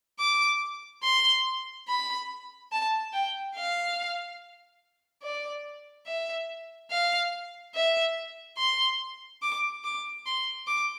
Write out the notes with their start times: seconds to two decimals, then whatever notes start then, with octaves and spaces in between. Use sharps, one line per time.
0.20 D6
1.03 C6
1.88 B5
2.72 A5
3.13 G5
3.55 F5
5.23 D5
6.06 E5
6.91 F5
7.75 E5
8.58 C6
9.42 D6
9.84 D6
10.26 C6
10.67 D6